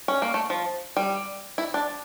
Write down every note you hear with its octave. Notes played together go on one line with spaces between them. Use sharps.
C#4
A#3
A3
F3
G3
E4
D4